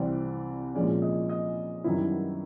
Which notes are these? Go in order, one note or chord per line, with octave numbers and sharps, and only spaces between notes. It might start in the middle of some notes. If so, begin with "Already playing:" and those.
Already playing: C2 C3 E3 G3 C4 D5
A#2 F3 G#3 C#4 D5
D#5
D#5
F#2 D#3 G3 B3 E4